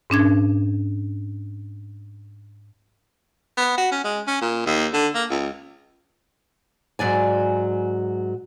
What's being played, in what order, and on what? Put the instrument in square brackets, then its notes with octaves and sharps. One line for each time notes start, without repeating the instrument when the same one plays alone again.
[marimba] G#2 C#4 D4 G#6
[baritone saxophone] B3
F#4
C#4
G#3
C#4
A#2
D#2
D3
A#3
C#2
[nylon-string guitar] G#2 F#3 D5 G#5